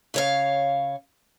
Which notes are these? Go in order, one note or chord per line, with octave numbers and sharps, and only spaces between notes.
C#3 C#5 F5